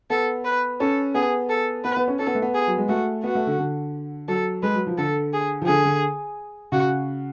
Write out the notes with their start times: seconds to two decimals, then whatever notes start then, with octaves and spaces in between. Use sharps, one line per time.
0.10 B3 A4
0.45 B4
0.80 C#4 A4
1.15 B3 G#4
1.50 A4
1.84 B3 B4
1.97 B3
2.08 C#4
2.19 C#4 A4
2.27 B3
2.35 A3
2.42 B3
2.54 G#4
2.67 F#3
2.78 G#3
2.89 A3 F#4
3.24 B3 F#4
3.35 A3
3.47 D3
3.58 D3
4.28 F#3 A4
4.63 G#3 B4
4.75 F#3
4.87 F3
4.98 D3 A4
5.33 G#4
5.62 F3
5.67 D3 G#4
5.85 D3
6.72 C#3 F#4